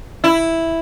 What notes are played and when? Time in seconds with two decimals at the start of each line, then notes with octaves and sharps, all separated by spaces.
0.24 E4